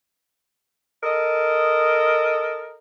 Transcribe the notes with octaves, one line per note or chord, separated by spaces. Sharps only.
A4 A#4 D#5